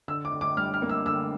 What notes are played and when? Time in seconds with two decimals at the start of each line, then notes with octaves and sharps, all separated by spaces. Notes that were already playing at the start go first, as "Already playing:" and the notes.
0.08 D3 E6
0.25 D6
0.32 D3
0.41 D6
0.57 G3 F6
0.74 F6
0.82 A#3
0.89 E6
1.06 D3 E6